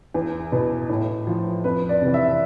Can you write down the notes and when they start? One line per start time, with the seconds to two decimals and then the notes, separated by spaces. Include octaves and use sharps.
0.14 E2
0.52 B2
0.89 A2
1.27 F3
1.64 F2 B4
1.89 D5
2.02 C3 E3
2.14 E5